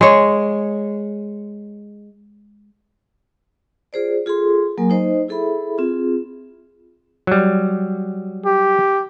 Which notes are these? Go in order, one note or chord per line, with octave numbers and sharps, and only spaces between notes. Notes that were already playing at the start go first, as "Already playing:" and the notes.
G#3 C#5
F4 G#4 C5 D5
F4 G#4 A4 C6
F#3 A#3 A#4 G#5
D#4 C5 D#5
E4 G#4 A4 E5 B5
C4 F4 G#4
F#3 G3
G4